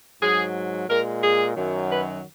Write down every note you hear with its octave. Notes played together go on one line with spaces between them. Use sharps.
G#2 F#3 G#4
A#2 G#3 A#4
G#4
F#2 D#3 F#3
B4